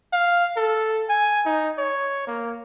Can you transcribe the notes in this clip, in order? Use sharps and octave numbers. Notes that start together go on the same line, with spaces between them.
F5
A4
G#5
D#4
C#5
A#3